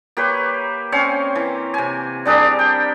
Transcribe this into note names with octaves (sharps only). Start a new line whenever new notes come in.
A#3 G4 B4 C#5
C4 C#4 C#5 F5
E3
C3 G#5
G3 D4 G#4 A#4
G5